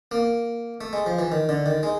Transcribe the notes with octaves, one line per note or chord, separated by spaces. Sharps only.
A#3
A3
G#3
F3
E3
D#3
D3
D#3
G#3